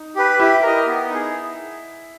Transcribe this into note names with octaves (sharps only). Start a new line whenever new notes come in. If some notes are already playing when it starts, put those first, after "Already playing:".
Already playing: D#4
G4 B4
E4 G4
A#4 D#5
B3
D#4 G#4